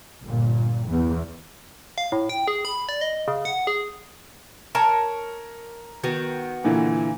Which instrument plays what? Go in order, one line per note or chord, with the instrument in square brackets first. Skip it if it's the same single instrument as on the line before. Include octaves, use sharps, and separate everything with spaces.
[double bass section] G1 A#2
E2
[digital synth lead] F5
A2
G5
G#4
B5
D5
D#5
C#3
F#5
G#4
[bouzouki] A#4 C#5 A5 [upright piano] A#5
[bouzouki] D#3 B3 F#4
[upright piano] A#2 D3 E3